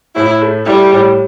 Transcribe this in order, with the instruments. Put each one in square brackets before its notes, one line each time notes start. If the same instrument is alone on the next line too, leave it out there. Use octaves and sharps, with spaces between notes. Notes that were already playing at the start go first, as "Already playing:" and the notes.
[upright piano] A2 [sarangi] E4
[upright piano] A3
[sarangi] G3 [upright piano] E4
[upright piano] A2